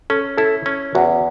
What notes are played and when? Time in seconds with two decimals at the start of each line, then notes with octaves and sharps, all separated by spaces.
0.10 C#4 A4
0.38 E4 A4
0.66 C#4
0.95 E2 F#4